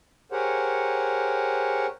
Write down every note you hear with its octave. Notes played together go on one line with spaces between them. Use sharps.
G4 G#4 A#4 C5 C#5 F#5